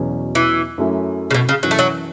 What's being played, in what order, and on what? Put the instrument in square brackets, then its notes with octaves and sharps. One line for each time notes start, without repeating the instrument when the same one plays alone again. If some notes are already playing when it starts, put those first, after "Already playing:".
Already playing: [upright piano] E2 B2 F#3 C#4
[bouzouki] E3
[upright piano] F#2 F#3 A3 C#4 E4
[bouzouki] C#3
B2
C#3
[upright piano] F#2 E3 C#4 E4 [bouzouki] F#3
[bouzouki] A3
F#3